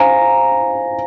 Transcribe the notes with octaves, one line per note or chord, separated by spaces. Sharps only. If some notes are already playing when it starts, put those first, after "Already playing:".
Already playing: C5 F5 G#5 A#5